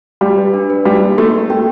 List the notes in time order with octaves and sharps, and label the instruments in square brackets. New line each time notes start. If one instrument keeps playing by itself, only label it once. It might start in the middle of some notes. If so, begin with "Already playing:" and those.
[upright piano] G3 [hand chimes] G4
[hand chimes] B4
D4
B4
[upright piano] G3 [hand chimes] D#4
[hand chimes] A#3
[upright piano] A3 [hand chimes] A#3
[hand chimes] A#3
[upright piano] A3 [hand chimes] G5